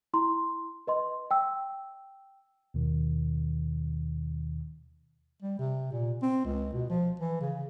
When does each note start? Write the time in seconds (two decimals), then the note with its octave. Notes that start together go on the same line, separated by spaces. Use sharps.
0.14 E4 A#5 C6
0.87 B4 D#5 C6
1.31 G5 E6
2.74 D#2 B2 D#3
5.43 G3
5.59 C3
5.93 A#2
6.22 C4
6.45 C#2
6.73 B2
6.90 F3
7.20 E3
7.41 C#3